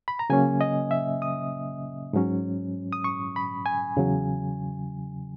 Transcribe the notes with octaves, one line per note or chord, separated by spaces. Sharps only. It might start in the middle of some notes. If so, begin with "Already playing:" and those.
B5
A#5
C#3 F#3 A#3 C#4 G#5
D#5
E5
D#6
G#2 F#3 C#4
D#6
C#6
B5
G#5
E2 C#3 F#3